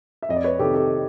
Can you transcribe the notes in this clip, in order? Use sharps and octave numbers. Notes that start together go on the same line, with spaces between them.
E5
F2 D#5
D5
B4 C#5
C3 D#3 G4 A4
G4 A4